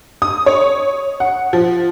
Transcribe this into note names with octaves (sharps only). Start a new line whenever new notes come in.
D#6
C#5
F#5
F3